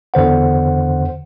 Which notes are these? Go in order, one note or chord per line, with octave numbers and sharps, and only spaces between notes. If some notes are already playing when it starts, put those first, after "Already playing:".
E2 D3 C5 F#5